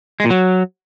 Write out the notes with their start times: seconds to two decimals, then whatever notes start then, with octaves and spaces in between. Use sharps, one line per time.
0.20 G#3
0.25 A#2
0.30 F#3